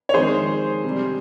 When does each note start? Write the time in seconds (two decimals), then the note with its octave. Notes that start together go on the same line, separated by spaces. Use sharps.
0.09 C#5
0.14 F2 D#3 G#3 G#4 C5
0.84 C3 G3